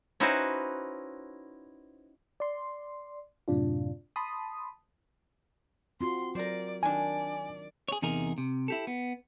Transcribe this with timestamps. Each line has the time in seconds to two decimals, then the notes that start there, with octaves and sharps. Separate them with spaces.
0.20 C#4 D#4 E4 F#4 B4 C5
2.40 D5 C6
3.48 F#2 A2 C3 D4 F4
4.16 A5 B5 C6 D#6
6.01 C4 F4 F#4 C6
6.35 F#3 A#4 C5 D5
6.83 D#3 D4 D5 G#5
7.88 G#4 C#5
8.02 E2 C3 D#4 G#4 A#4
8.38 C3
8.68 E4 G4 A4
8.87 B3